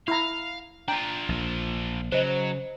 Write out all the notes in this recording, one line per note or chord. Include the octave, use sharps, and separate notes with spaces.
E4 F5 A#5
D4 F4 G5 A#5
A#1
C#3 F#3 C5 D#5